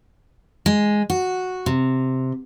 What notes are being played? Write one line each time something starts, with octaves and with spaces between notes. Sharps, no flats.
G#3
F#4
C3